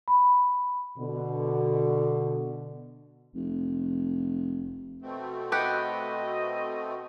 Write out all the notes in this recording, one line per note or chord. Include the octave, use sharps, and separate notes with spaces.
B5
B2 D3
F1
B2 A3 C4
B3 G4 D#5 F#5